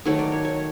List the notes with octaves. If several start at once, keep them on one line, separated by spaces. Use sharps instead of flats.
D#3 F#3 A3 C#5
D5
C#5
C#5